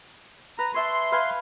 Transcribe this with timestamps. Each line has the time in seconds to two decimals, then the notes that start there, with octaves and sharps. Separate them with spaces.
0.59 B4 A#5
0.74 C#5 E5 A5 C6
1.12 B4 F5 G#5